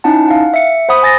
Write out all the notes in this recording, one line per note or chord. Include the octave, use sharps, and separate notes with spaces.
C#4 D#4 E4 F#5 A5
F5 F#5
E5 C#7
C5 F#5 B5 D#6
G#5 A6 A#6